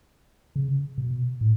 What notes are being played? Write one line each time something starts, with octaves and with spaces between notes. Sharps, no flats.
C#3
B2
A2